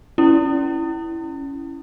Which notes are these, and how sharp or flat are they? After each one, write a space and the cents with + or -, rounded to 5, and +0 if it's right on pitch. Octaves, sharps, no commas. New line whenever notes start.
C#4 +0 E4 +0